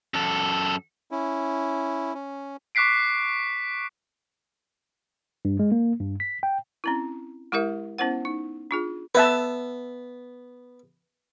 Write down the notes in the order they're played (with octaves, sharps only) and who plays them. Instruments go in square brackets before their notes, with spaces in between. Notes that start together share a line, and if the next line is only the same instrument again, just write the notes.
[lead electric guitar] F#2 A4
[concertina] C#4 E4
C#4
[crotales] C#6 D6 F#6 B6 C7 D7
[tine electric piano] G2
G#3
A#3
G2
B6
G5
[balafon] C4 C#4 E4
G#3 E4 G4 A#4 E5
B3 C#4 E4 C5 F#5
D#4
D4 F4 G#4
[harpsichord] B3 [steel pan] B4 E5 A5